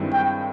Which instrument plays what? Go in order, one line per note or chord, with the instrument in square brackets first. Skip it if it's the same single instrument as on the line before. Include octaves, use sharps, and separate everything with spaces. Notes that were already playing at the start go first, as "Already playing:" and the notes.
Already playing: [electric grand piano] G2 D#3 G#3 C4 E4
[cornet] G5